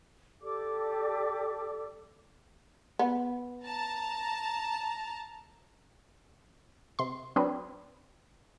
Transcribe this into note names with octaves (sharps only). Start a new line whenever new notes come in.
G4 A4 D5 D6
B3
A5 A#5
C3 C6
F#3 C4 D4 B4